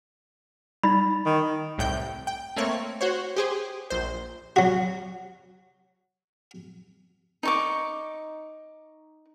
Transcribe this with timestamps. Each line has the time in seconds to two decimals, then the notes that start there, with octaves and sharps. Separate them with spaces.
0.83 G3 D#4 B5 A6
1.26 D#3
1.78 C2 A2 G5 G6
2.27 G5
2.56 A3 A#3 C4 C#5
3.01 F#4 C5 C#5
3.36 G4 G#4 C5
3.90 A#1 C5
4.56 F#3 F#4
7.43 D#4 C#6 D6